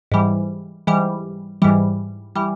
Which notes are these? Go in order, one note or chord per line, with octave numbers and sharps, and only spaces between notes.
G#2 E3 G3
G#2 E3 G3
G#2 E3 G3
E3 G3